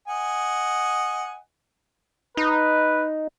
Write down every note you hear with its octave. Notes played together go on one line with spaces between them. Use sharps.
D#5 F#5 G#5
D#4 B4